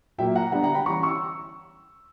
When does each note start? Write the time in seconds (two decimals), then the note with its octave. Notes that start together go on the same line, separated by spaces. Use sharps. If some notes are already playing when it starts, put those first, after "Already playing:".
0.18 A#2 F#3 A#3 E5 G5
0.36 F#5 A#5
0.52 D3 G3 B3 D4 F#5 A#5
0.63 F#5 A#5
0.74 G5 B5
0.86 E3 G3 C#4 A#5 C#6
1.03 C#6 E6